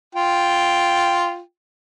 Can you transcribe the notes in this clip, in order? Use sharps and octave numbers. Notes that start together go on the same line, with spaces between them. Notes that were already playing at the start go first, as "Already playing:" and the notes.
F4 G5